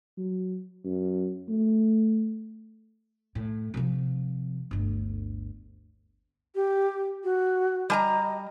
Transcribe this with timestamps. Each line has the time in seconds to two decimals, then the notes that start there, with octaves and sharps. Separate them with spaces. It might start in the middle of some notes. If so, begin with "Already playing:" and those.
0.17 F#3
0.84 F#2
1.48 A3
3.35 A2
3.74 C3 F3
4.71 G1 D2
6.55 G4
7.24 F#4
7.90 G3 D#5 G#5 A#5